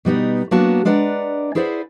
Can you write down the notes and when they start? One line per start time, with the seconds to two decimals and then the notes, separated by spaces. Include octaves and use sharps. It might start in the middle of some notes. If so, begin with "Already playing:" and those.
0.05 B2 G3 B3 D#4
0.51 F#3 A#3 B3 D4 F#4 A5
0.85 G#3 D4 B4 D5 F#5 A#5
1.55 E4 G#4 B4 C5 D5 F#5